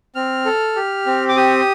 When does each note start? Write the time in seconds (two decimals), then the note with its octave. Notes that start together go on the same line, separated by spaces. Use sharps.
0.15 C4 F6
0.45 A4
0.76 G4
1.06 C4
1.29 D6
1.36 G4 D#6